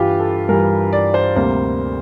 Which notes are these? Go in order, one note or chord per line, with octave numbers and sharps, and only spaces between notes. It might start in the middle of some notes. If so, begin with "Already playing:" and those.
Already playing: G2 E3 G3 F4 G4
A4
G2 E3 G3 A#4
D5
C5
D2 C3 G3 A#3 C5